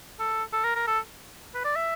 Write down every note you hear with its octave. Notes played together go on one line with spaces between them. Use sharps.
A4
A4
A#4
A#4
A4
B4
D5
E5